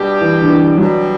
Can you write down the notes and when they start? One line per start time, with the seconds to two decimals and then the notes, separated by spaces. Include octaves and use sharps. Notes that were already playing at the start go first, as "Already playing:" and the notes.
Already playing: B2 G3 D4 G4
0.21 E3
0.42 D3
0.49 E3
0.77 B2 F#3 G3 D4 G4